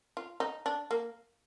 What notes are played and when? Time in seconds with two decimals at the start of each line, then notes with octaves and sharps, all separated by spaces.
0.17 F4
0.40 D#4
0.66 D4
0.91 A#3